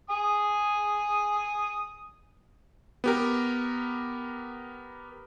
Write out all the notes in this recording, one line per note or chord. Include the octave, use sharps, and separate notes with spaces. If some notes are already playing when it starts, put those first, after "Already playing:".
G#5 D#6
B3 G4 A#4